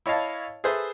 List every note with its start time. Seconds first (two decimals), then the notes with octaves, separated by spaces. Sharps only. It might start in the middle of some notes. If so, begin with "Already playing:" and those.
0.06 E4 C#5 D#5 F5 A5
0.64 G#4 A4 B4 C5 E5